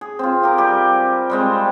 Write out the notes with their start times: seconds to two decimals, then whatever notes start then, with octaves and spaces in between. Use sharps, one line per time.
0.01 G#4
0.19 C4 F4
0.43 G4 A#4
0.58 G3 G4 G#5
1.30 G3 G#3 C4